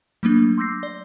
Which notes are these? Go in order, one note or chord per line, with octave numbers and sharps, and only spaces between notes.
F#3 A3 A#3 D4
C6 D6 E6 G6 A#6 C7
D5